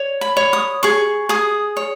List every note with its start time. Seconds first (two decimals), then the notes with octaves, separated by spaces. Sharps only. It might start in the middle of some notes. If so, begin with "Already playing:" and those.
Already playing: C#5
0.21 B5
0.37 C#5
0.53 D#6
0.83 G#4 C#6
1.29 G#4 D#6
1.77 C#5